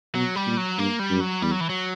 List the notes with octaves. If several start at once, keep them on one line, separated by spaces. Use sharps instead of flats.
B2 F#3
G3
A#2
F#3
G2 A#3
G3
F#2
F#3
E2 G3
F#3
E3
F#3